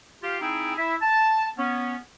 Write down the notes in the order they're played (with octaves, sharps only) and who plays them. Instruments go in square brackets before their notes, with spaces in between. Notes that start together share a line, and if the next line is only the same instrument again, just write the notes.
[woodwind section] F4 G4 F5
C4 D#4 E4 G#4 E5 G5
E4 E5
A5
B3 C#4